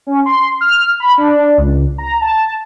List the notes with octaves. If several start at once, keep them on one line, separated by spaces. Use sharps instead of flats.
C#4
C6
F6
B5
D4
C#2
A#5
A5